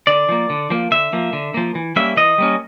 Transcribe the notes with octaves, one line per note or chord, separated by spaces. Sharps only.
D3 D5
F3 A#3
D3
F3 A#3
D3 E5
F3 A#3
D3
F3 A#3
E3
G3 A#3 C#4 E5
E3 D#5
G3 A#3 C#4